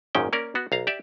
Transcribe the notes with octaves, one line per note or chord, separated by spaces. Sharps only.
G#1 F#2 A#2 D#3 C#4 G5
A#3 C#4 A#4 D5
B3 F#4
B1 F5 A#5
G4 D5 E5